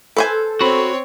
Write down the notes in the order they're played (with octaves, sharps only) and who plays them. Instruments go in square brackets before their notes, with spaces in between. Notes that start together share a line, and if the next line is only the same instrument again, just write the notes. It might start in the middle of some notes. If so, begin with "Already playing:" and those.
[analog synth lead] A4 [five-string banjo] B4 C5 G#5
[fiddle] C4 C#5 [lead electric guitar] F#4 B5